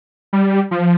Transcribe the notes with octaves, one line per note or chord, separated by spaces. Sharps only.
G3
F3